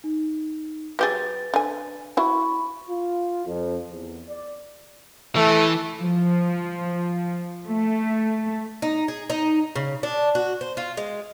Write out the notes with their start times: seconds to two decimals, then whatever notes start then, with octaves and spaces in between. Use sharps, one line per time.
0.04 D#4
0.99 F#3 G4 G#4 B4 A6
1.54 D3 G#5
2.17 E4 F#4 B5 C#6
2.89 F4
3.46 F2
3.91 E2
4.29 D5
5.36 E3 A3
5.99 F3
7.65 A3
8.82 D#4
9.08 G#4
9.30 D#4
9.76 C#3
10.03 D4
10.35 F#4
10.61 C5
10.77 F4
10.97 G#3